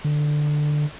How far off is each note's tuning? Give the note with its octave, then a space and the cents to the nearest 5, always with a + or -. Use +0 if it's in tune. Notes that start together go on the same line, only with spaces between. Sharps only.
D3 +15